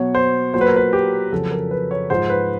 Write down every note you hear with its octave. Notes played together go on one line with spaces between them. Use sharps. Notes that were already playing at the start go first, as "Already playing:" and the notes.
Already playing: B2 F#3 C#5
C5
A#2 F#3 C5
B4
A#4
B4
G4
F2 C#3 F#3 A4
A#4
B4
C#5
G#2 F3 C5
B4